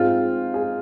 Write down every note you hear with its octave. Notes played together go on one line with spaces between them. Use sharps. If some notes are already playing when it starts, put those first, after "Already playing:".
Already playing: G#2 G#3 C4 F4
G#4